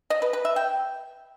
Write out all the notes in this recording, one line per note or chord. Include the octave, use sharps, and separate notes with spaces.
D#5
B4
B4
E5
G5